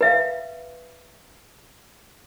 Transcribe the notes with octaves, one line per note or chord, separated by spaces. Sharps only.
B4 E5 F5